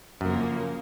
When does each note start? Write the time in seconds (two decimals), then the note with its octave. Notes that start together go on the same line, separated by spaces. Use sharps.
0.21 F#2 C#3 F3 A#3